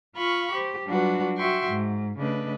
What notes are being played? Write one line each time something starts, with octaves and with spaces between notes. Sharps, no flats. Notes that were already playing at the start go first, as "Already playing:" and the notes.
F4 F5 B5 C#6
G4 C5
F#3 G3 D4 F4 F#4 B4
F#4 E5 G5 C6 C#6
G#2
C#3 A3 D4 B4 D#5